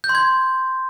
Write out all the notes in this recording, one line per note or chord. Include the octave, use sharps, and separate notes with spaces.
G6
C6
G#6